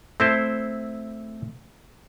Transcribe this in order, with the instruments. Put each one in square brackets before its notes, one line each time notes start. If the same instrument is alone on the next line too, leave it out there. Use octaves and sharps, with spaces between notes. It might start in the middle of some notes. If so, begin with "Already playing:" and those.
[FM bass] A3 [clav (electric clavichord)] C4 E4 C5